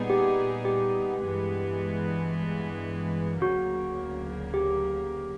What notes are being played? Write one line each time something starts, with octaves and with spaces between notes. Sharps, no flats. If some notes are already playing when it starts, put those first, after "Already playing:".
Already playing: A#2 G3 B3 D#4 G#4
G4
G4
G2 E3 G#3 B3
D2 C#3 F#3 A#3 F#4
G4